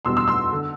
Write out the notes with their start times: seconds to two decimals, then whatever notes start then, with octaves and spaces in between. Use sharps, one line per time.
0.05 E2 B2 G3 C6 E6
0.17 C6 E6
0.28 C6 E6
0.52 D3